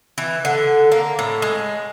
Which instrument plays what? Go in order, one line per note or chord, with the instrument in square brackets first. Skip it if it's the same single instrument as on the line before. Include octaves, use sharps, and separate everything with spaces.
[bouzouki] E3
D3
A#3
A2
G#3